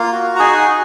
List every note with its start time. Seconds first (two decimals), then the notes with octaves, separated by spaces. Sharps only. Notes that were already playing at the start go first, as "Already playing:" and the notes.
Already playing: A#3 F4 F5
0.12 F#4
0.36 A#5
0.39 D#4 G#4 G#5
0.68 F#4